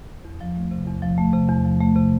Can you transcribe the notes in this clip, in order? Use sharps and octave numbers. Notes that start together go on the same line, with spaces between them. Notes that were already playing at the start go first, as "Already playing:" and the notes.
E2
F3
A3
C3
E2
F3
A3
C3
E2
F3
A3
C3